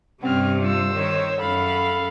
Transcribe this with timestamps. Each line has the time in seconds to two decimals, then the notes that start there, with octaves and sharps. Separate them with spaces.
0.23 G2 C3 C4 C#4 F6
0.62 F4 C5 E6
0.93 D#3 C#5
1.41 F#2 A4 F5 B5